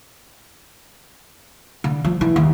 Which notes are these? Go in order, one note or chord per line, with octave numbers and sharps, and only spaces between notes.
D3
F3
E3
D#2